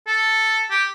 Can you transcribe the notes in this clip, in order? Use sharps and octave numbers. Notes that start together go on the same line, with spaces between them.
A4
G4